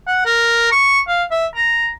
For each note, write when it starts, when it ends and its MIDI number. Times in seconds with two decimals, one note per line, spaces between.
0.07 0.24 78
0.26 0.69 70
0.72 1.00 85
1.08 1.24 77
1.31 1.46 76
1.55 1.89 82